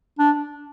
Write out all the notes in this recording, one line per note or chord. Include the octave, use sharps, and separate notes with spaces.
D4